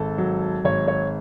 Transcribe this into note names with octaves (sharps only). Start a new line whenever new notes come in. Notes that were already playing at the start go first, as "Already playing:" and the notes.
Already playing: G#1 A4
F#3
G#1 C#5
C#5